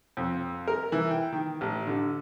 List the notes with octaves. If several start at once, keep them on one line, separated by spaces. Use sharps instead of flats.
F2
A#4
E3
G5
D#3
A1
D3